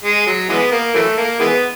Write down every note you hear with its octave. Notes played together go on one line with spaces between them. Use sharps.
G#3
F#3
E3 G#3 B3
A#3
E3 F#3 A3
A#3
E3 G#3 B3